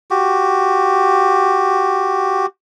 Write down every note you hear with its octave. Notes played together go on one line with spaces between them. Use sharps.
F#4 G4